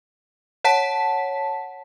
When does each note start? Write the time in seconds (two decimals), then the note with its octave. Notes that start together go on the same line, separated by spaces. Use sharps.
0.64 C#5 F#5 A5 B6